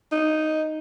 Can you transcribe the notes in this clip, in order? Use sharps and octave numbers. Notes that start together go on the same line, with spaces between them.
D#4